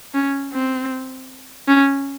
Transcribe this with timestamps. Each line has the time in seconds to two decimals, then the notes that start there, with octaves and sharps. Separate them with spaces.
0.14 C#4
0.53 C4
1.68 C#4